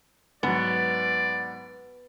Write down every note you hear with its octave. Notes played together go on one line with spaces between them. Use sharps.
G#2 F#3 B3 D5